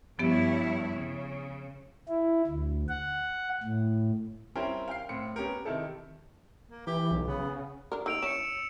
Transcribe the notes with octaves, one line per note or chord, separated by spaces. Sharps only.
G2 F3 B3 E4 G4 C#5
C#3
E4
D2
F#5
A2
G3 C4 C#4 E4 A#4 G5
F5 G5 F6 C7
A2 C4 C#7
B3 C#4 G4 A#4
C3 D#3 E4 A4
A#3
E3 G4
B1
C#3 B3
D4 A#4
D#3 A#3 E6 D7 F7
C#4 E4 C#7 E7